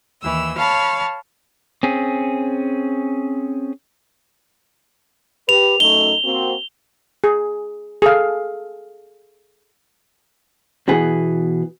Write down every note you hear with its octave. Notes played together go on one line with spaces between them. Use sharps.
D#2 E3 E6
C#5 F5 A5 B5
C4 C#4 G#4
G4 B4 F7
F#2 A3 D#4 G7
A#3 C4 F#4
G#4
G#4 A4 F5
B2 E3 B3 G#4